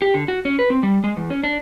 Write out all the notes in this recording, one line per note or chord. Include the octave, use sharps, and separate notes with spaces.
G4
D3
F#4
C#4
B4
C4
G3
G#3
E2
C#4
D4